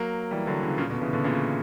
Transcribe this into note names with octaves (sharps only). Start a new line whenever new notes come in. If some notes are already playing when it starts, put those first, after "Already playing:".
Already playing: F#3 A#3
E3 G3
D3 F#3
C#3 E3
A#2 C#3
B2 D3
C#3 E3
B2 D3
A#2 C#3